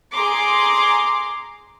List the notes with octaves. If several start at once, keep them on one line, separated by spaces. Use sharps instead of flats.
G#4 A#5 C6 D6